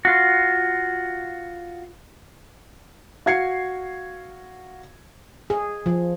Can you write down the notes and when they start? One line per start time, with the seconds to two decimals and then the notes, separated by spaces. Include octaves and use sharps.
0.05 F4 F#4
3.26 F#4 F5 G#6 C7 C#7
5.50 G#4
5.86 F3